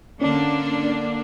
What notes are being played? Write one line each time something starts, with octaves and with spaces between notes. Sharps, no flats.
D3 A#3 C#4 D4